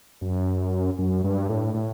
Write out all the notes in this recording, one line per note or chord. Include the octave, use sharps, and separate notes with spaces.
F#2
F#2
G2
A2
A2